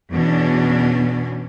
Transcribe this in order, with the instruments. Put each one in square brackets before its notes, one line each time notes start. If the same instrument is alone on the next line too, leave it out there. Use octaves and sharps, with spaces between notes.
[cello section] E2 B2 C#4 D4